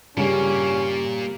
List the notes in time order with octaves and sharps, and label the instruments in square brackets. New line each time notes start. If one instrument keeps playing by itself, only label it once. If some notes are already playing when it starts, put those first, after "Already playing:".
[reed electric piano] G2 C#3 [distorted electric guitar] A#2 A#3 [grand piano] G3 [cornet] C#4